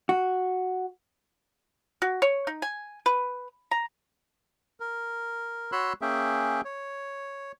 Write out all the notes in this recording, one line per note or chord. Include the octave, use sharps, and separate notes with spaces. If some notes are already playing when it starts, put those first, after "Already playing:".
F#4
F#4
C#5
D#4
G#5
B4
A#5
A#4
F#4 C#5 B5 C6 E6 F#6
A#3 C#4 G#4 E5 G5
C#5